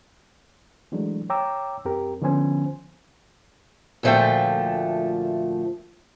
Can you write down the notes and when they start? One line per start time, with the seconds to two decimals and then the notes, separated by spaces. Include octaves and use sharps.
0.92 E3 F#3 G#3 A3 D4
1.30 C#5 G5 A#5 D6 E6
1.85 F#2 C4 G4 A#4
2.22 D3 F3 B3 C#4 C5 G#5
4.03 D2 A#2 F3 A3 A4 G5